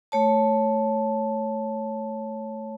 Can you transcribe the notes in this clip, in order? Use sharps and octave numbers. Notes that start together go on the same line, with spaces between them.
A3 C#5 A5